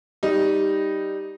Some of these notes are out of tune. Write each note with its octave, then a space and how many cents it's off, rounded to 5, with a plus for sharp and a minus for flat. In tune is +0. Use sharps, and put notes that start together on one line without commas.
G3 +0 D#4 +0